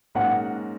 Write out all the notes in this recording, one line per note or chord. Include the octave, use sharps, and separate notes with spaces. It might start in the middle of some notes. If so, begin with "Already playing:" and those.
G#2 F#3 A#3 C#4 F#4 F#5